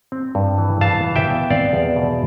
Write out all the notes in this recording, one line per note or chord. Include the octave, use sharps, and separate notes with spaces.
C4
G2
E3
E3 F5 A5
E3
E5 G5
B3
C4 D5 F5
E2
B2